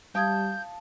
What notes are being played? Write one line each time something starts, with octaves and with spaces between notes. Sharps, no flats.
G3 F5 A5 D#6 G6 G#6